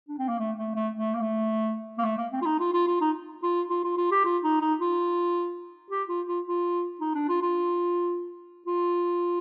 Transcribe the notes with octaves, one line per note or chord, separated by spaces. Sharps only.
D4
C4
A#3
A3
A3
A3
A3
A#3
A3
A#3
A3
A#3
C4
F4
D#4
F4
F4
F4
D#4
F4
F4
F4
F4
G4
F4
D#4
D#4
F4
G4
F4
F4
F4
D#4
D4
F4
F4
F4